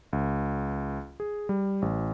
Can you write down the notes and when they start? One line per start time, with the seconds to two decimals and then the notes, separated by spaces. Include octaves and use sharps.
0.13 C#2
1.20 G#4
1.49 G3
1.82 A1